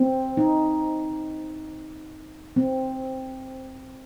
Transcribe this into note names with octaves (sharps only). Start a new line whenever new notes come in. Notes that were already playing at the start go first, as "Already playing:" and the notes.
Already playing: C4
D#4
C4